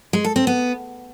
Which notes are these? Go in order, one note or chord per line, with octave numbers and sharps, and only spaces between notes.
G#3
A4
C4
B3